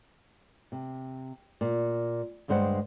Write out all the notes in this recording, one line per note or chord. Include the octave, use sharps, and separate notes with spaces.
C3
A#2
D2 G2 G#3 C5 F#5